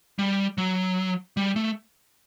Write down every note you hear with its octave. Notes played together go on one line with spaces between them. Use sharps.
G3
F#3
G3
A3